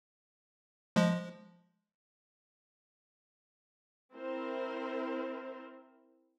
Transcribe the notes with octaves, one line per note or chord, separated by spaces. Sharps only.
F3 G#3
C4 E4 A#4 C5